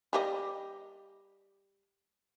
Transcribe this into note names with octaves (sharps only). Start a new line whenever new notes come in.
G3 G4 D#5